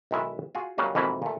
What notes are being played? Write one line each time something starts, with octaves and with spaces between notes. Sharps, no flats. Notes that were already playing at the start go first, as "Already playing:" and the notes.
B1 D#3 G#3 E4 E5
F4 F#4 G#4
C#3 F#3 G3 A#3 D#4 F#4
F2 G#2 B2 E3 A#3 E4
A#2 A3